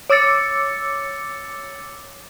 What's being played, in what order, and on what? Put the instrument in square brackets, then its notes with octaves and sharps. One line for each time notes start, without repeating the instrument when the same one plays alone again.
[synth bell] C#5 D6 E6 A6 C#7